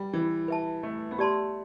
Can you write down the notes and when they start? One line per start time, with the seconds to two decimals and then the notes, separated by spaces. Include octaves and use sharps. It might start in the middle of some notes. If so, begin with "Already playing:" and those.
Already playing: G3 B4
0.13 E3
0.48 B4 E5 A5
0.83 A3
1.11 B3
1.18 A3 G4 D5 A5 C6